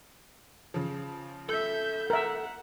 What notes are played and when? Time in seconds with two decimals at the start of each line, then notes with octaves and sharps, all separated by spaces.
0.74 C#3 F3
1.49 A4 E5 G6
2.10 A#4 E5 F#5